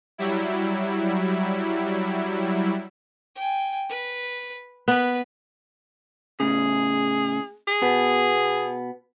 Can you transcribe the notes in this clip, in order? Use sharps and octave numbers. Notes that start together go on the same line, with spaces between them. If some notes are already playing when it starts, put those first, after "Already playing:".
F#3 G3 E4
G5 G#5
B4
B3 B4
A2 C#3 G#4
G#4
B2 B3